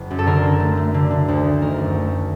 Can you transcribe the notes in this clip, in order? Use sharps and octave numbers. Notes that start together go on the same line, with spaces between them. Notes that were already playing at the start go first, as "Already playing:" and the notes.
Already playing: F#1
F#2
A4
D3 A#4
D3
A3
A3
D3
D3
D2
D2
D#3 A#4
F#2
A3